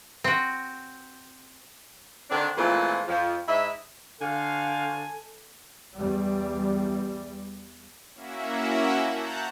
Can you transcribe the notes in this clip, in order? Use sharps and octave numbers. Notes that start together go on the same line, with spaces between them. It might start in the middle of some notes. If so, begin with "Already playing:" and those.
C4 F#4
D3 D#3 C4 D4
A#2 E3 F3 G#3 A3 C4
F2 F3
G#2 E4 D#5 E5
D3 F#4 A4 C5 F5 G#5
E2 G3
A#3 C#4 E4 F#4 E5
F#5 A5 A#5 F#6 G6